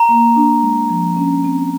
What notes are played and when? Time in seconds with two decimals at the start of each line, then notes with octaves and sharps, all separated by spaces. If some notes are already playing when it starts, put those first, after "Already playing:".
Already playing: A#5
0.09 A#3
0.36 D4
0.63 G#3
0.89 F3
1.17 C#4
1.44 C4